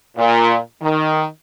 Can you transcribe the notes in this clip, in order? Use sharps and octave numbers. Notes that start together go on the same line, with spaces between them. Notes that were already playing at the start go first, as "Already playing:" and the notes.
A#2
D#3